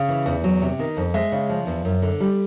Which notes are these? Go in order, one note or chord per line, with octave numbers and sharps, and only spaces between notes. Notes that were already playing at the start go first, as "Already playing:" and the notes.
Already playing: C#3
E3
E2
F#3
C3
D#3
F2
G#3 E5
C#3
F3
E2
F#2
D3
G3